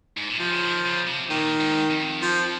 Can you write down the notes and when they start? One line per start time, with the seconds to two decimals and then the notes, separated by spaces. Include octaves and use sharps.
0.17 G#2
0.29 A#2
0.39 C3 F3
0.52 C#3
0.62 D#3
0.86 C#3
1.07 C3
1.30 A#2 D#3
1.61 G#2
1.91 F2
2.22 F3